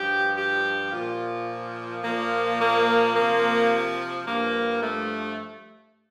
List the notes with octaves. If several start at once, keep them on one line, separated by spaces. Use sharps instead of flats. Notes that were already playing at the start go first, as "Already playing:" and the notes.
Already playing: G2 F3 G4
G4
A#2 F3 F4
A#2 F3 A#3
A#3
C3 F3 A#3
G2 F3 A#3
A3